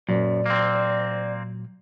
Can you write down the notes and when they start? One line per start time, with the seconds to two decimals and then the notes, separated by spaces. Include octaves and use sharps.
0.09 F#2 A#2 F#3 C5 D5
0.46 A#3 C4